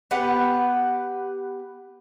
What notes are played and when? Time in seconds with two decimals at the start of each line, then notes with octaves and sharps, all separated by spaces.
0.11 B3 G4 B4 F#5